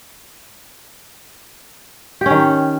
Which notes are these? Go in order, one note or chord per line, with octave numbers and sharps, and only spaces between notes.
D#3 C#4 G4